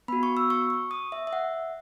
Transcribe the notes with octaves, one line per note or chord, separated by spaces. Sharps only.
B3 F#4 B5
C#6
E6
C#6
C#6
D#6
E5
E5
F#5